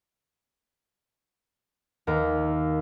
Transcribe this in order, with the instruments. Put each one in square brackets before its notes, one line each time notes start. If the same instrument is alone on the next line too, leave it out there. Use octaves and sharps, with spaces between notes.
[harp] D#2 A#4